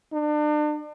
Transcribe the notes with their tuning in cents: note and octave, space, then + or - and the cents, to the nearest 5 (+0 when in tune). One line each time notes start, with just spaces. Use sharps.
D4 +35